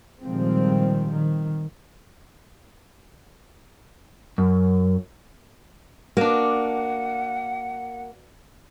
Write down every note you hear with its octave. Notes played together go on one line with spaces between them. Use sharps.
A#2 D#3 F3 G3 G#3 C4
D#3
F#2
A#3 D4 F#4 F#5